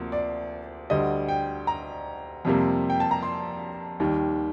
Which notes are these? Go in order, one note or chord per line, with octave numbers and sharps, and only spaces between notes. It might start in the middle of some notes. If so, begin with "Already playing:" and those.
Already playing: D2 C3 F3 A#3
D5
D2 D3 G3 D#5
G5
A#5
F2 C3 G3 A#3
G5
A5
A#5
C6
D#2 D#3 G3